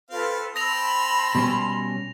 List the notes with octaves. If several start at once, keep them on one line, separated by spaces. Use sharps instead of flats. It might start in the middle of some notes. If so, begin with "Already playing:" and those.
C4 F4 A4 B4 F5
C4 A5 B5 C6 E6 A#6 F7
B2 G3 C#4